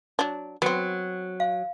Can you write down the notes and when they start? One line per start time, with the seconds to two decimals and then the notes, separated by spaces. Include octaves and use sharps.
0.19 F#3 D4
0.62 F#3 B3 C4
1.40 F5